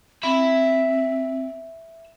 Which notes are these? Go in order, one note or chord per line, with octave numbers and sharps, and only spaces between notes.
C4 E5 B5